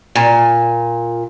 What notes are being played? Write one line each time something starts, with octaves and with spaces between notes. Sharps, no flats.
A#2